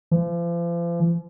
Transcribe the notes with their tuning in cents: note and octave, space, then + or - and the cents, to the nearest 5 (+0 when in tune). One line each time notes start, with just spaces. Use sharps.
F3 -40